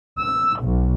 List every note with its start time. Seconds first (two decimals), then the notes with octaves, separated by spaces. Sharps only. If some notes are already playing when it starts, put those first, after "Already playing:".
0.18 E6
0.61 B1